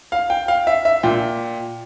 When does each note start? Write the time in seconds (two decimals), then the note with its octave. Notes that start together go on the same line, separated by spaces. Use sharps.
0.12 F5
0.30 G5
0.48 F5
0.67 E5
0.85 E5
1.03 A#2 G5